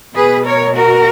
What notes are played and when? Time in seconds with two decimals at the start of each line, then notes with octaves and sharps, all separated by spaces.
0.15 B2 G#4 B4
0.46 A#4 C#5
0.77 F#4 A#4